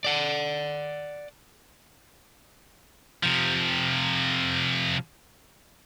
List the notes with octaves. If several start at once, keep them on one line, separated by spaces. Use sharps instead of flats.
D5 F#5
C3 F3